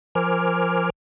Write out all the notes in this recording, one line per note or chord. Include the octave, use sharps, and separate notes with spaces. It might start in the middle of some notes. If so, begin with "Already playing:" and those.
F3 A#4 C5 G#5 D6 F6